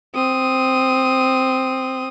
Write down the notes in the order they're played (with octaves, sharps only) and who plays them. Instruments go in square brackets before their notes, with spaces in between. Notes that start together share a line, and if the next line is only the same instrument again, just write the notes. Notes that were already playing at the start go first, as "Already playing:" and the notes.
[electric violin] C4 D#6